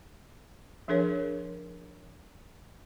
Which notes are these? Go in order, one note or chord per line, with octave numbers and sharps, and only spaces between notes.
F3 D4 G#4 A#4 C#5